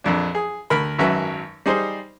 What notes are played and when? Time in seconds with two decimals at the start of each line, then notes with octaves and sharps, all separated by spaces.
0.04 A#1 F2 D4
0.35 G#4
0.70 D2 A#4 B5
0.98 G#1 F#2 F#3 B4 E5 G#5
1.66 G3 D#4 G#4 C5